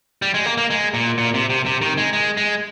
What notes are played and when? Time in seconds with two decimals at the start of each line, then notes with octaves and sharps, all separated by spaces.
0.22 G3
0.34 G#3
0.46 A#3
0.57 A#3
0.70 G#3
0.94 A#2
1.18 A#2
1.34 C3
1.50 C3
1.66 C3
1.81 D#3
1.98 G#3
2.13 G#3
2.37 G#3